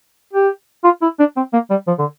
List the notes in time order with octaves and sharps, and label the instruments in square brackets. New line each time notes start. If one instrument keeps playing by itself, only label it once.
[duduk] G4
F4
E4
D4
C4
A#3
G3
F3
D3